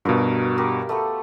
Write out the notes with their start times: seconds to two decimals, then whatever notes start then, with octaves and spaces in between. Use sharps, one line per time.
0.05 G2 B2 F4 F#4 A#4
0.58 G4 A#4
0.89 A3 B3 A4